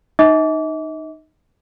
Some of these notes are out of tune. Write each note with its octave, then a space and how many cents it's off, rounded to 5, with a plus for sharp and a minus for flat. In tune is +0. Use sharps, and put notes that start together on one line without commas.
D#4 -15 D#5 +45 D6 -30